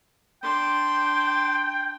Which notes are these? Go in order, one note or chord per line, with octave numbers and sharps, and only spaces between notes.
D4 G5 C6